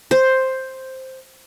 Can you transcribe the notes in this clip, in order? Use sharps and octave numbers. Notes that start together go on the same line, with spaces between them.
C5